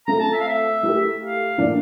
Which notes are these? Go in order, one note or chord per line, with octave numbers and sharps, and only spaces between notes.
A3 C4 F4 A4 A#5
A5
E5
F5
E5
A3 E4 G4 A#4
F5
A2 E3 A#3 D4